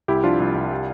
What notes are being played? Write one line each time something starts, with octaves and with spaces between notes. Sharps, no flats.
C2 E4 G4
F3 D4 F4
C2
C2
G3